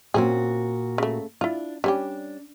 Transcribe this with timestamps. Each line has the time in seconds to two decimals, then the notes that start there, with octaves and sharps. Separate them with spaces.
0.14 A#2 C4 C#4 F#4 G#4
0.98 C#3 A3
1.41 D4 E4 F4
1.84 G3 C#4 D4 G4